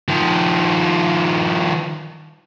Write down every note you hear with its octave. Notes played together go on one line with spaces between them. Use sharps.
D#3 F3